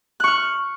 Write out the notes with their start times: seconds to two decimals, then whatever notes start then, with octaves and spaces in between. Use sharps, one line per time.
0.20 F#6
0.24 C#6
0.27 F6